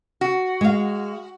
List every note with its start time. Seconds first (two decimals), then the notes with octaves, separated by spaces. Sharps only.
0.21 F#4
0.61 G#3 F5